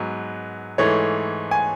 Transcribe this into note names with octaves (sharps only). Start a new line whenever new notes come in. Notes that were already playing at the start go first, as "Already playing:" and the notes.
Already playing: G#2 F#3 B3
G#2 E3 A3 C#5
G#5